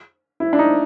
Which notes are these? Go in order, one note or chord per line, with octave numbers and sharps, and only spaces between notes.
E4
D4
D#4